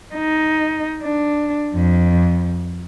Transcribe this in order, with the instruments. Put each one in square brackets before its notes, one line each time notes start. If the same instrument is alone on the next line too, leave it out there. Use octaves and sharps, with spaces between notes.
[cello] D#4
D4
F2